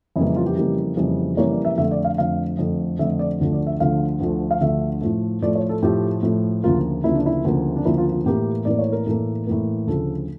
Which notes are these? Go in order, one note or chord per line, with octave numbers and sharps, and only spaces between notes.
F2 C#3 E3 G3 A#3 E4
E4
F4
G4
F2 C#3 E3 G3 A#3
F2 C#3 E3 G3 A#3
F2 C#3 E3 G3 A#3 C#5
D5
E5
F2 D3 A3 E5
D5
F5
F2 D3 A3 F5
F2 D3 A3
F2 D3 A3 E5
D5
D2 D3 F3 A3
D5
E5
D2 D3 F3 A3 F5
D2 D3 F3 A3
F5
D2 D3 F3 A3 E5
A2 F3 A3
A2 F3 A3 D5
C#5
A4
A2 F3 A3 G4
A2 F3 A3
D2 C#3 F3 A#3 F4
D2 C#3 F3 A#3 E4
D4
E4
D2 C#3 F3 A#3
D4
D2 C#3 F3 A#3 E4
F4
F4
A2 E3 A#3 G4
A2 E3 A#3 D5
C#5
A#4
A2 E3 A#3 A4
A2 E3 A#3
D2 C#3 F3 A4